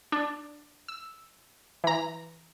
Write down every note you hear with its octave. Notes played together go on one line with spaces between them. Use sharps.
D4
E6
E3 A#5